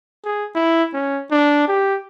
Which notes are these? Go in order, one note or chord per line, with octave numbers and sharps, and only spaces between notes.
G#4
E4
C#4
D4
G4